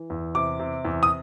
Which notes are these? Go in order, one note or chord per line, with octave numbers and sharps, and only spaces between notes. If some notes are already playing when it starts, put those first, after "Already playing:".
Already playing: E3
E2
C3 D6
C3
E2
D#6